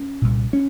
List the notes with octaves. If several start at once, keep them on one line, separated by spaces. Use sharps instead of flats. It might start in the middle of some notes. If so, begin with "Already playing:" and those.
Already playing: C#4
C2 A#2
C#4